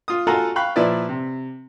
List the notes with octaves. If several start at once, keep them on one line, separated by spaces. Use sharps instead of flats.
F4 D#6
F4 F#4 A4 F#5 G#5 A#5
F5 G5 B5 C#6 F#6
A#2 F3 E4 B4 D5
C3